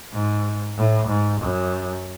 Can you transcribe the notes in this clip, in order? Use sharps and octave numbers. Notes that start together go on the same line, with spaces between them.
G#2
A2
G#2
F#2